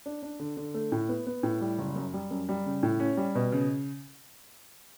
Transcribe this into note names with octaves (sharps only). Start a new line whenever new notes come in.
D4
D4
D3
D3
A3
A2
B3
B3
A2
G3
F#1
F#2
G3
F#2
G3
C#3
A2
C#4
G3
B2
C#3